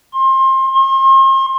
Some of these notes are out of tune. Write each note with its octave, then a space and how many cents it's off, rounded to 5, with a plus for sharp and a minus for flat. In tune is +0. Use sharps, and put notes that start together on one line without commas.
C6 +25
C6 +40